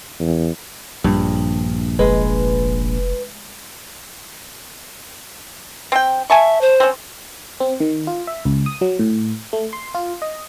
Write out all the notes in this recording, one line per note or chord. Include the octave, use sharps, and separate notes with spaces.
E2
A#1 G2
F1 G#3 B4
C4 G5
E5 G#5 A5 C#6
C5
C4 C#4
C4
D#3
F4
E5
C#2
D#6
F#3
A2
A3
C6
F4
D#5